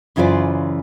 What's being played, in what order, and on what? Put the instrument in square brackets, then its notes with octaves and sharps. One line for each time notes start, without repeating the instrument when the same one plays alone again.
[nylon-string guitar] F#2 C#3 E3 F4 C5 D5